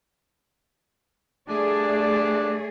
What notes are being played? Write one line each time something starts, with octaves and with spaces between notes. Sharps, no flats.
G2 A3 D4 G#4 D5